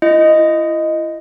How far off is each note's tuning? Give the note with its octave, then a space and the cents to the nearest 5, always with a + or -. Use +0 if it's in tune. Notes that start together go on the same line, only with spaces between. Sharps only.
E4 +35 D#5 +0